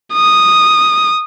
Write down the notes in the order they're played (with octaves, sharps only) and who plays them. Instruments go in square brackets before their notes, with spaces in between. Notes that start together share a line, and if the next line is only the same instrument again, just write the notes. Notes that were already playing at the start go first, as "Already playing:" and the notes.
[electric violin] D#6